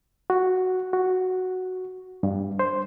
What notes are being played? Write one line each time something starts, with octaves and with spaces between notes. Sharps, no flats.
F#4
F#4
G2
C5